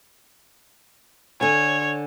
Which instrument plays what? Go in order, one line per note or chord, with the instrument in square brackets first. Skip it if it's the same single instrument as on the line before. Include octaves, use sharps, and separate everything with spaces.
[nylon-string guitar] D3 G#5 [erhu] C#5